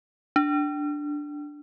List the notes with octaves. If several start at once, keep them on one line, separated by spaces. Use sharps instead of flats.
D4